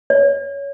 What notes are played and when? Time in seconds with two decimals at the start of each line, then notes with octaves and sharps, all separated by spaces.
0.10 C#5